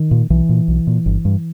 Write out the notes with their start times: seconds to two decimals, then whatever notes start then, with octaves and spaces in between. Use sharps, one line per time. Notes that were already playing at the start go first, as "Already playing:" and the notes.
Already playing: D#3
0.11 A#2
0.30 B1 E3
0.49 A#2
0.68 B1
0.87 A#2
1.06 G1
1.25 G2